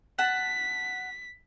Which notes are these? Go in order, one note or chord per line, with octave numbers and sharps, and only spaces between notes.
F#5 A5 B6